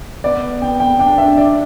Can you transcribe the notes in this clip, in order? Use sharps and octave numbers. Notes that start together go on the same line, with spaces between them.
B3 D5
G5
G5
D4 G5
E5
D5